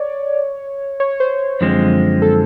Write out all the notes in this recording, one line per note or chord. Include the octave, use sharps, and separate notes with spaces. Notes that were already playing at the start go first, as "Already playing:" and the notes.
Already playing: C#5 D5
C#5
C5
F#2 D3 F3 G#3 C4
A4